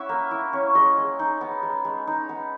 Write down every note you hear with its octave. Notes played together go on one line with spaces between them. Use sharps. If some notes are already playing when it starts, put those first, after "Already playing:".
Already playing: C#4 E4 E5 F#5
A#3
E4
C#4
G#3 D#5
G#3
D#4
B3
G#3
G#3
D#4
B3